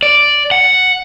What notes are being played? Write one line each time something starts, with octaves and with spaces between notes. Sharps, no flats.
D5
F#5